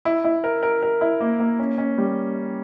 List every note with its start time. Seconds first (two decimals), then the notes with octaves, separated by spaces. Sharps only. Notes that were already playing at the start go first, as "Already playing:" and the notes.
0.05 E4
0.24 E4
0.44 A#4
0.63 A#4
0.83 A#4
1.01 E4
1.21 A#3
1.40 A#3
1.59 C#4
1.78 C#4
1.98 G3